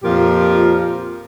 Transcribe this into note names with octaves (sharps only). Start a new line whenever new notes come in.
F2 A#2 F3 F4 G4 A#4